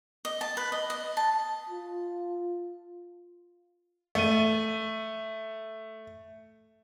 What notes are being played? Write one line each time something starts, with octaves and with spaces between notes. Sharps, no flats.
D#5
A5
B4
D#5
D#5
A5
F4
A3 D#7